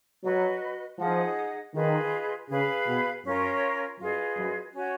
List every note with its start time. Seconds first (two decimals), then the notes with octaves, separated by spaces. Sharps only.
0.24 F#3 F#4 B4 D#5
0.99 F3 D#4 G#4 D#5 F#5
1.74 D#3 F4 G#4 B4 D#5
2.49 C#3 G#4 B4 F5
2.87 B2
3.25 F#2 C#4 F4 A#4 C#5
4.00 F#2 F4 G#4 B4 D#5
4.37 F#2
4.75 C#4 F#4 C#5 F#5